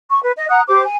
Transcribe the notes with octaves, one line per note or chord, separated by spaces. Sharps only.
C#6
B4
D#5
F#5 A#5 D#6 F#6
G4 C5 D6
G#5